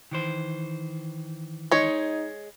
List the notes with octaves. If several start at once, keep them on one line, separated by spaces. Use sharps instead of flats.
D#3 E3 C5
G#3 D#4 C#5